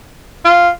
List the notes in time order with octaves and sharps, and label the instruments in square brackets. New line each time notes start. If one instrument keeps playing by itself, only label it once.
[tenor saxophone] F4